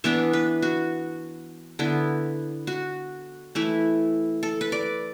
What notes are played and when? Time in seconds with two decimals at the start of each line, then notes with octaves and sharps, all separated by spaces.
0.04 E3 B3 D4 E5
0.33 B4
0.62 F#4
1.79 D3 B3 E4
2.67 F#4
3.55 E3 A3 E4
4.43 A4
4.61 B4
4.72 D5